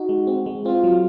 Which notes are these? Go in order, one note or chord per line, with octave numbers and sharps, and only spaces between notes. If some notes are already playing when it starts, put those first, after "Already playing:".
Already playing: D#4 F#4
G#3
C4
G#3
C4 F4
F#3